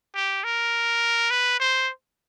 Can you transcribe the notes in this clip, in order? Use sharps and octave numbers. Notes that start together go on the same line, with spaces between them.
G4
A#4
B4
C5